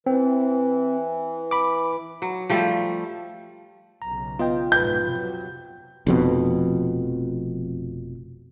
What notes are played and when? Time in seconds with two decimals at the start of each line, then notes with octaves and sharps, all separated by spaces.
0.06 E3 C4
1.51 B5 D6
2.22 F#3
2.49 F3 G3 A3
4.02 B1 C#3 A#5
4.39 B3 F4 D#5 G5
4.72 B1 F2 G#2 B4 G5 G6
5.05 C3 F#3
6.07 F1 F2 B2